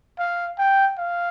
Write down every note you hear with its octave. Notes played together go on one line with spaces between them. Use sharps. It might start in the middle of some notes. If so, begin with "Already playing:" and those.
F5
G5
F5